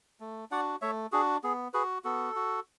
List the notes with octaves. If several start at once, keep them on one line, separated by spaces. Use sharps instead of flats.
A3
D4 F#4 D5 F#5
A3 C#5 E5
D4 F#4 G#4
B3 G#4
F#4 G#4 B4
B3 F#4 A4
F#4